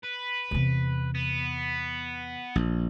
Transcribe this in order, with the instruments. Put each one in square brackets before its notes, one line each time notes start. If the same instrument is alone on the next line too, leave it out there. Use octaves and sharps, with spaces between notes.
[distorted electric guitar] B4
[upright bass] E2 C3
[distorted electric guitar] B3
[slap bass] A#1